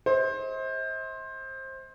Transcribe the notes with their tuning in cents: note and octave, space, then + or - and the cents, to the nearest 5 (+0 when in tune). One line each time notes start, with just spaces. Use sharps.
C5 +20 D#5 +45